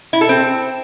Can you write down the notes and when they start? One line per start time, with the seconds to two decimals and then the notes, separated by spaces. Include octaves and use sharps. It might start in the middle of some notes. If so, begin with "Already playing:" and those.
0.13 E4
0.21 A4
0.29 C4